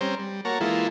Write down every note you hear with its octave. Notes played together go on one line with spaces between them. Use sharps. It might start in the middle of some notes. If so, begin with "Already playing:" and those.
G3 C4 C#4 C5 A#5
G3
A#3 F#4 C#5 A5 A#5
E3 G#3 A#3 E4 F4 A4